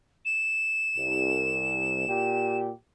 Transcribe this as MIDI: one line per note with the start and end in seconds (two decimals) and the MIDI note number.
0.25 2.57 100
0.97 2.04 36
2.08 2.70 46
2.08 2.70 67